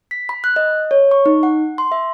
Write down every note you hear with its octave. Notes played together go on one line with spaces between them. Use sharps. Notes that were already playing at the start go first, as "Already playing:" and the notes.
B6
B5
F#6
D#5
C#5
C#6
D#4
F#5
C6
E5